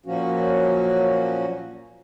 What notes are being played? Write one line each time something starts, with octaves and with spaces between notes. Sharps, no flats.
A#2 F3 F#3 A#3 C#4 F#4